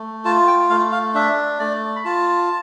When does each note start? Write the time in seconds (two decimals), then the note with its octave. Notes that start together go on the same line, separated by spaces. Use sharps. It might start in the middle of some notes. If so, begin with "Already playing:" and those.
Already playing: A3
0.25 F4 A5
0.47 G5
0.70 A3 F5
0.92 F5
1.14 D4 E5
1.59 A3 D5
1.96 B5
2.05 F4 A5